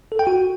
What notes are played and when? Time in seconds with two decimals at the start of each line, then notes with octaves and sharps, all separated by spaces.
0.12 A4
0.19 G5
0.27 F#4